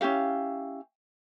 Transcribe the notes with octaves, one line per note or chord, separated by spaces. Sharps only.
C#4 E4 G4 F5